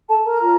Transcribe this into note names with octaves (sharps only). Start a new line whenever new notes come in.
A4 A5
A#4 A#5
F4 A#4 C#5